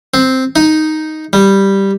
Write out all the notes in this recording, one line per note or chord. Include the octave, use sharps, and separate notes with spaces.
C4
D#4
G3